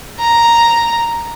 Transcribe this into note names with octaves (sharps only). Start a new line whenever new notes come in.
A#5